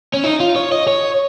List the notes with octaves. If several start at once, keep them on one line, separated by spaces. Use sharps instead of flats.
C#4
D#4
F4
C#5
D#5
C#5